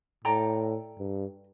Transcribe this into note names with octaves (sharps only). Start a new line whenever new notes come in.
A2 A4 D5 G5 A#5
G2